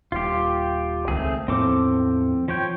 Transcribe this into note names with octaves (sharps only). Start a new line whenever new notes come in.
D#1 F4 G4
C#2 D#3 A3 C4 G#4
E2 A2 F3 C4 A4 D6
F3 C#5 G5